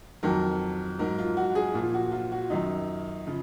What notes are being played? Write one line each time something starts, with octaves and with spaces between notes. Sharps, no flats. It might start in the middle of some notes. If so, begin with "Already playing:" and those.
F2 D#3 F#3 A#4
G#2 F#3 A#4
F4
F#4
G#4
A#2 F3 F4
F#4
F4
F#4
F#2 D#3 F#3 D#4
C#3 F3